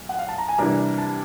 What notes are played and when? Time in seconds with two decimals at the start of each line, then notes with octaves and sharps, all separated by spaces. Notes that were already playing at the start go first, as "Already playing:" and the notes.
Already playing: B1 A#2
0.09 F#5
0.19 F5
0.29 A5
0.38 A#5
0.49 G#5
0.58 C3 E3 G3 A#3 D4 A#5
0.98 A5